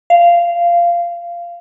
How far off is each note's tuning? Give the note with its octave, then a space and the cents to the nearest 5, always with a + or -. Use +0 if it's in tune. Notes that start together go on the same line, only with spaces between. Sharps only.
F5 -15